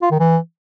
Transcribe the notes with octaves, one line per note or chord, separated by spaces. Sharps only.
F4
D#3
E3